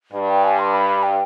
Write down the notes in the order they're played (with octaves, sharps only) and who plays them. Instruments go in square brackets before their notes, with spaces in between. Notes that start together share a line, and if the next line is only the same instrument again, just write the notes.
[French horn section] G2
[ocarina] G5
G#5
C6
B5
G5